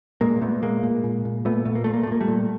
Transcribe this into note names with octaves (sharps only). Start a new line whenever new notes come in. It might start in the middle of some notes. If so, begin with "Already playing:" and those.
A#2 G#3 A#3
A#2 A3 B3
A#2 G#3 A#3
A#2
A#2
A#2
A#2 A3 B3
A#2 A3
A#3
A#2 A3
A#3
A3
A#2 A#3
G3 A3
A#2